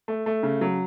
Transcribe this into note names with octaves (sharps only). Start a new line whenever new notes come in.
A3
A3
C#3
F#3